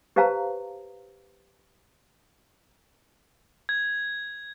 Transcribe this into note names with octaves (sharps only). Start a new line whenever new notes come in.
G4 B4 C5 F5 A5 A#5
G#6